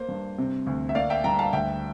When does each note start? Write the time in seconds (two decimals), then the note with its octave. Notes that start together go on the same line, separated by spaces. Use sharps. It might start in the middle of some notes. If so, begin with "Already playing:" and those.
Already playing: A#3 C5
0.09 G2
0.38 C3
0.67 D2
0.89 E5
0.95 A#3 D5 F5
1.10 E5 G5
1.24 G2 G5 A#5
1.39 F5 A5
1.53 D2 E5 G5